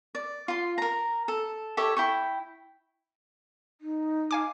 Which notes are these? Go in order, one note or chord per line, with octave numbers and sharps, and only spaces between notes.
D5
F4 C6
A#4 A#5
A4
G4 A4 C#5 E5
E4 G5 C#6
D#4
F5 G#5 D6